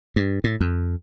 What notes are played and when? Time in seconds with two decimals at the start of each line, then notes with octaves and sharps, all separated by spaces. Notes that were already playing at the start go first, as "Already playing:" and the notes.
0.16 G2
0.44 A2
0.61 F2